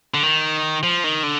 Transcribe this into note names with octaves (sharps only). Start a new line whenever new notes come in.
D3
D#3
F3
D#3
D3